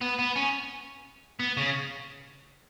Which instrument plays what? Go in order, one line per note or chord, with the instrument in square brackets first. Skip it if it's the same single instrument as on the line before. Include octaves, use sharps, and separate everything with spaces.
[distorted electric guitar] B3
B3
C#4
B3
C#3